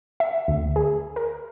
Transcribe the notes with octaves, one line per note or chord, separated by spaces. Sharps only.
E5
D2
G#4
A#4